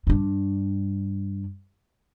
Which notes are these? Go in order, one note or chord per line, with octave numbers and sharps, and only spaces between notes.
G2 D4